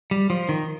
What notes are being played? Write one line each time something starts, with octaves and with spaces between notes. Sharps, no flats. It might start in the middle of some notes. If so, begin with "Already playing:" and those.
G3
F3
D#3